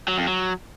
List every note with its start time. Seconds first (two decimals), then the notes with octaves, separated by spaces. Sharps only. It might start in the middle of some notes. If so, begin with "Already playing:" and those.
0.08 F#3
0.18 F2
0.27 F#3